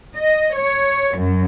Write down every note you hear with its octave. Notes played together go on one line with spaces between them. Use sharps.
D#5
C#5
F#2